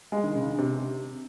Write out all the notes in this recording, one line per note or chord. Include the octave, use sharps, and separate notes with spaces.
G#3
D#3
C#3
D3
C3